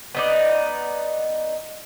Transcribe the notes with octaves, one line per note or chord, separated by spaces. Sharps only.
B3 D#4 D5